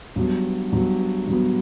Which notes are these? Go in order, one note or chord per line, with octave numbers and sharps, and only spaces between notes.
G2 F#3 B3
G2 F#3 B3
G2 F#3 B3